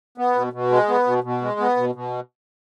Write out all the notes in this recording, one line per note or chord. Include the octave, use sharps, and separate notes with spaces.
B3
B2
B2
G#3
B3
B2
B2
G#3
B3
B2
B2